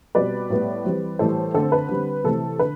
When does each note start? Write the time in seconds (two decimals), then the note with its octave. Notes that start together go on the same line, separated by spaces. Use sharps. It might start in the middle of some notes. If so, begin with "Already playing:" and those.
0.15 B2 G3 C4 B4 D5
0.50 A2 G3 B3
0.85 E3 G3 C4
1.19 A2 E3 G3 A4 C5
1.54 D3 A3 C4 A4 C5
1.72 B4
1.89 D3 G3 C4
2.24 C3 E3 A3 C4 A4
2.59 D3 B4